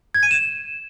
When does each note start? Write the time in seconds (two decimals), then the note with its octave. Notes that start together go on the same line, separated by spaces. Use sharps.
0.14 G#6
0.23 D#7
0.31 E7